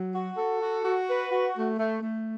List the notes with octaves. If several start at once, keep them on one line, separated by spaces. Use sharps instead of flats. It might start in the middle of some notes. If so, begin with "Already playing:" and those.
Already playing: F#3
F#4
A4
F#4
F#4
B4
F#4
A3
A3
A3